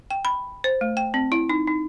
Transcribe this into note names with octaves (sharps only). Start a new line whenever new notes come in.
G5
B5
C5
A3
G5
C4
E4
D#4
D#4